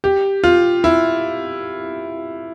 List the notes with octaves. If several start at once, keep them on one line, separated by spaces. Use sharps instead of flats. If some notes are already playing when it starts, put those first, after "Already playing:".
G4
F4
E4